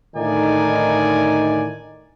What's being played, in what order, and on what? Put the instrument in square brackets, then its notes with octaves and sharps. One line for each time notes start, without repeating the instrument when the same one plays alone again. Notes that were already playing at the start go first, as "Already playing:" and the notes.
[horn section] A2 D3 D#3 D#4 D5 G#5